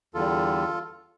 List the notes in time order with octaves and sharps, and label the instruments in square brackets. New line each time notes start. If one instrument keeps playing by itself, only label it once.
[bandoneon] E2 D3 G3 F4 A4